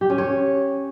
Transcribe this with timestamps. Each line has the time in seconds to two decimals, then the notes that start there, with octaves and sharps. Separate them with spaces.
0.01 G4
0.10 C#4
0.18 C#5